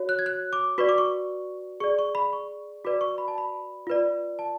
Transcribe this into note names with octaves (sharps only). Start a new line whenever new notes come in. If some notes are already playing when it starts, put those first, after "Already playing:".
Already playing: F#4 C#5
F#6
G#6
F#6
D6
F#4 B4 D5 C#6
D6
C#6
G#4 D5 C#6
C#6
B5
C#6
F#4 B4 D5 D6
C#6
B5
A5
B5
F4 B4 D5
A5